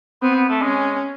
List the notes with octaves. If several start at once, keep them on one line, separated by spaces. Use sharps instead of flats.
B3 C4
B3
A3
G#3 C#4